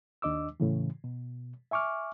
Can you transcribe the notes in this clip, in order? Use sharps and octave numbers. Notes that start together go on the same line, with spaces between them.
D#2 D4 D#5 D6 E6
A2 C#3 E3
B2
E5 G#5 C#6 D6 F6